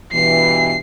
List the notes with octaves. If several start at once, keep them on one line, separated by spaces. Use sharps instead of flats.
G2 B2 E3 C7